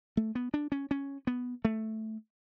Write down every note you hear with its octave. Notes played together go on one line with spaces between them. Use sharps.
A3
B3
D4
C#4
C#4
B3
A3